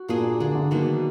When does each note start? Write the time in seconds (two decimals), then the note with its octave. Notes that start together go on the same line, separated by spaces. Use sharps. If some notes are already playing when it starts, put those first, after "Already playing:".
Already playing: F#4
0.09 A#2 A#3 D4 G#4
0.40 D3 A#3 D4 G#4
0.55 D3
0.71 B2 D#3 F#3 A#3 D4